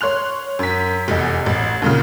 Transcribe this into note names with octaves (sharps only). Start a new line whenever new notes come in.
C#5 C6 F#6 F7
F#2 B6
F1 E2 D#5
A1
D#2 A#2 C#3